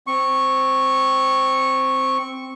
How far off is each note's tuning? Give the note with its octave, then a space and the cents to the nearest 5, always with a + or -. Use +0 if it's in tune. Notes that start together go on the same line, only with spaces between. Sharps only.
C4 +0 C#6 -10